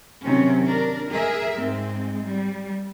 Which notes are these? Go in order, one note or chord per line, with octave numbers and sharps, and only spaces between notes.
C3 D#3 F#3 C4 C#4
D4 A#4
G#4 A#4 E5
G#2 G#3 C4
G3